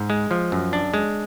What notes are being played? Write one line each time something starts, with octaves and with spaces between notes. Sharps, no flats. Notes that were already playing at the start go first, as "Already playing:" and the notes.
Already playing: G#2
G#3
F3
F#2
D4
G#3